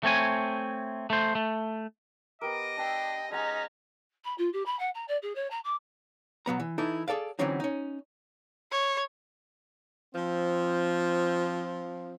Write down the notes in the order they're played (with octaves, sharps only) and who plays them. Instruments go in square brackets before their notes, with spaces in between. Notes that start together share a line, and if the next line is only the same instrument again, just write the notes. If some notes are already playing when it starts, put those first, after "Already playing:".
[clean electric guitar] A3 C4 C#5 G#5
A3 C5
A3
[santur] B3 G4 A#4 [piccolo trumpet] D#5 [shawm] D6
[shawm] D4 [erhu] G5 [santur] A5 E6
[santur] G#3 F#5 G#5 [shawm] C#4 [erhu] D#4 [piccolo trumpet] A#5
[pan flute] B5
F4
G4
B5
F#5
A#5
D5
G#4
C#5
A#5
D6
[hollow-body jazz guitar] B2 F#3 B3 A#5
E3
E3 D#4 E4 A4
G#4 A4 D5 F5
D3 E3 F#3 C4 C#4 D#4
C#4 D#4
[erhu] C#5
[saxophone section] F3 C4